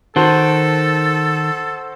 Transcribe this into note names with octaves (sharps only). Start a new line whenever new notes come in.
D#3 F#4 A4 C5 A5